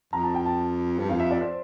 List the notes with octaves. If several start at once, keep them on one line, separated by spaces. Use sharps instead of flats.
F2 A#5
A5
G5
A5
G2
F2 F5
E5
D5
C5